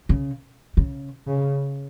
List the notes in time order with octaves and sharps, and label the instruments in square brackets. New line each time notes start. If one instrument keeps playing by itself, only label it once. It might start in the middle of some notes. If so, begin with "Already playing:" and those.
[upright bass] C#3
C#3
[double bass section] C#3